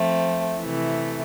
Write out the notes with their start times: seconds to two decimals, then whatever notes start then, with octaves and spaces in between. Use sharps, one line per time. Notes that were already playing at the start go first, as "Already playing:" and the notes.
Already playing: F3 A3 C4
0.61 C3 E3 A3